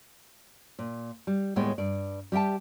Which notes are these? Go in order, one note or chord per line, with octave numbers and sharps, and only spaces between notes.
A#2
G3
D#2 A2 G3 G#3 B3 G5
G2 D5
G3 G4 E5 G5 A5